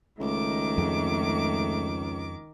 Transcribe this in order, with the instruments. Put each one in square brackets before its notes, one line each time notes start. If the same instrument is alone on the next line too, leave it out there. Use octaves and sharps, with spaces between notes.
[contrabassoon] C#2 [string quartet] D#3 D6 [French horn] A3
[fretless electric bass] F2 G#3